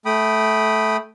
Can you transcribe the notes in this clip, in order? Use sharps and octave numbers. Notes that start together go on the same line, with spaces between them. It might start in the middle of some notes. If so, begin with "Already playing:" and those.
A3 G5 B5 D#6